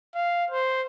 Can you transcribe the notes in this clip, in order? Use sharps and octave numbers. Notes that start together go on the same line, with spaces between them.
F5
C5